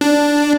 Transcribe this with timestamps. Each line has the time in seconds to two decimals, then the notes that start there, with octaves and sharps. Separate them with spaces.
0.01 D4